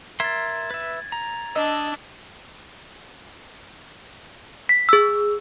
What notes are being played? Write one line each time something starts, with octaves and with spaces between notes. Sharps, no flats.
A#4 E5 C6 G#6 A6
B4 E5
A#5
D4 D#5 E6
B6
G#4 E6